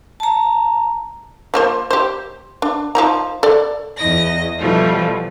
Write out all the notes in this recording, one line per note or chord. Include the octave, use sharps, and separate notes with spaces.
A5 A#5
F3 A#3 C5
G4 C5
D4
F3 D#4 A#5
A4 D5
E2 D#5 A#6
B2 E3 F3 G3 A3 F4